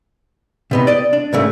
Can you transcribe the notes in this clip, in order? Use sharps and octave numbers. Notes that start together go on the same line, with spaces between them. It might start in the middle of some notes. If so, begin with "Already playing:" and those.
C3 B3 D#4
D5 D#5
D4
G#2 C#3 A3 A#3